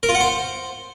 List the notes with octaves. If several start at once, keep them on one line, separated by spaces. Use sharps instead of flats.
A#4
F4
F#5
C5